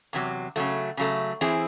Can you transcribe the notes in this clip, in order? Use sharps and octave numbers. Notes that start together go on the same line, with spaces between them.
E2 C3 F#3
C#3 F#3 A3
C#3 F#3 A3
E3 C4 E4 G#4